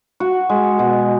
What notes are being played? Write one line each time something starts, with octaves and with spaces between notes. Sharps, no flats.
F#4
G#3
B2